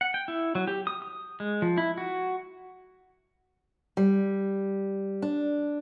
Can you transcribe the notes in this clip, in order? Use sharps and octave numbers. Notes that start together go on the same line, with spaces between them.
F#5
G5
E4
F#3
G4
D#6
D#6
G#3
F3
E4
F#4
G3
D4